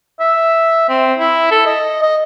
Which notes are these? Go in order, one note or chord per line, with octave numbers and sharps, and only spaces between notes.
E5
C4
E4
A4
D#5
D#5